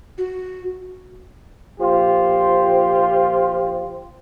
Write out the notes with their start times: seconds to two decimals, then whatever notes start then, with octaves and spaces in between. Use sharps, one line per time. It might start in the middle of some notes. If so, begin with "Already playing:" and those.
0.18 F#4
1.80 A#2 F3 F4 G4 C5